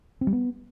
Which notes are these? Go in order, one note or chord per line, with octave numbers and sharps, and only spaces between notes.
C4
G3
B3